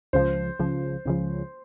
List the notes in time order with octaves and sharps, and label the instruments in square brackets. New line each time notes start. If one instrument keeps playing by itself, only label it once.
[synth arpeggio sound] C#2 C#3 F3 [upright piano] C5
[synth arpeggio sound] C#2 C#3 F3
C#2 C#3 F3